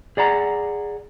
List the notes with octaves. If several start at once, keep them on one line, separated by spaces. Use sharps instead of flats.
G#4 D5 F#5 A#5